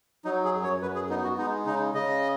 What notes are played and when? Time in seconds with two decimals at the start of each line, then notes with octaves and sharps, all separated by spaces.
0.25 F#3 D#4
0.44 G#4
0.54 F#2
0.63 C#5
0.82 F#2 B4
0.96 G#4
1.10 B3 D#4
1.24 F#4
1.38 G#3 D#4
1.66 C#3 D#4
1.94 C#3 D#5